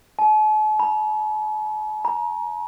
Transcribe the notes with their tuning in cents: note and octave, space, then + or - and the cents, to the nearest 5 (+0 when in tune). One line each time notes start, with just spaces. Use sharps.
A5 -45
A#5 +35
A#5 +25